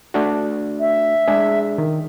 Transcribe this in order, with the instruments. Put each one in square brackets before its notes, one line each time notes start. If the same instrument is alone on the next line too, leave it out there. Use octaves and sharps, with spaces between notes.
[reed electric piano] A3 D4 F#4
[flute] E5
[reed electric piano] G#3 D4 G#4
D#3